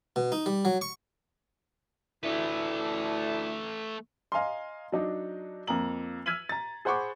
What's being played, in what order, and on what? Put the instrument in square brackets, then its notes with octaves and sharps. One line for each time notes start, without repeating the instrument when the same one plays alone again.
[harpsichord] B2
D#4
G3
F#3
C#6
[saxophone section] D2 D4 E4 [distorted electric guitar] A3 B4
[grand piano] D#5 F5 G#5 A#5 C6
F#3 D4 D#4
F2 A#3 A#5 F#7
E6 F6 G#6 B6 D#7 F#7
A#5 A6
G#4 C5 F#5 B5 C#6 D6